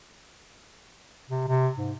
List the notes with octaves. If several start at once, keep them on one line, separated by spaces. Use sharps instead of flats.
C3
C3
G#2